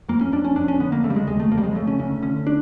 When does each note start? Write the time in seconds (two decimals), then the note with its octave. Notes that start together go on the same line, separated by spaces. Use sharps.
0.09 F2 A#3
0.21 C#4
0.32 F2 D4
0.45 C#4
0.56 F2 D4
0.68 C#4
0.80 D3 B3
0.92 A#3
1.04 C#3 A3
1.10 G3
1.16 G#3
1.27 D#2 G#3
1.40 A3
1.51 F2 A#3
1.58 G3
1.64 G#3
1.75 C#3 A3
1.87 C#4
1.99 D2 C#4
2.22 D3 C#4
2.47 D4